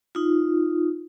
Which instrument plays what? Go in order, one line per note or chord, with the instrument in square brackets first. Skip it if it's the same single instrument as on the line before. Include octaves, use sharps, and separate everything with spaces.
[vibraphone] D#4 F4